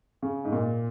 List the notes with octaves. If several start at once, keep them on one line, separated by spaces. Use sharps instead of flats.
C#3
G#2
A#2